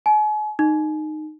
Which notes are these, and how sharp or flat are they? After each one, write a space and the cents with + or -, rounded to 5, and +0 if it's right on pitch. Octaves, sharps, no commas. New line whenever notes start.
G#5 +40
D#4 -15